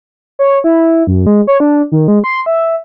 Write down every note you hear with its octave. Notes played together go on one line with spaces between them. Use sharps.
C#5
E4
F#2
G#3
C#5
D4
D#3
G#3
C6
E5